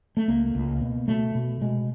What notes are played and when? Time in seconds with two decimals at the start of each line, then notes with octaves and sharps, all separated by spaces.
0.17 A3
0.28 C#2 A#3
0.55 C#2
0.81 B2
1.08 B2 A3
1.35 B2
1.61 B2 G#3